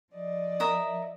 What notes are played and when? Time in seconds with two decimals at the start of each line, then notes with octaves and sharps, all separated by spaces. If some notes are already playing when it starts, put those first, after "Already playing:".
0.13 F3 D5 D#5
0.60 A#4 E5 D#6